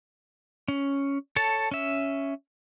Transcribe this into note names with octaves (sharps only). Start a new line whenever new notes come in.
C#4
A4 C#5 A5
C#4 E5